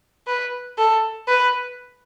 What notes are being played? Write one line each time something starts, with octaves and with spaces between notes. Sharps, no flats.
B4
A4
B4